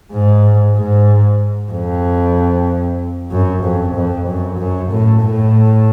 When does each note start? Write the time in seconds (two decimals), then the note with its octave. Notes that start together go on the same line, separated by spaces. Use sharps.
0.12 G#2
0.77 G#2
1.72 F2
3.31 F#2
3.63 F2
3.95 F2
4.27 F#2
4.59 F#2
4.91 A2
5.23 A2